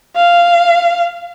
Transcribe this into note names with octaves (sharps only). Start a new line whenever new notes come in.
F5